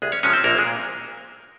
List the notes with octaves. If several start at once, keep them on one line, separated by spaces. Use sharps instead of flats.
C2 G#3 G#4
C#4 C#5
C3 F3 G#3 C#4 C#5
C4 C5
A#1 A#3 A#4
G#3 G#4
A#2